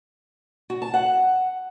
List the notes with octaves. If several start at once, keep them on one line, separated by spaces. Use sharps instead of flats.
F#4
A5
F#5